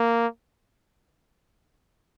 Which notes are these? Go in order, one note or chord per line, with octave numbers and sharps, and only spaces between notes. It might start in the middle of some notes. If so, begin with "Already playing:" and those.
Already playing: A#3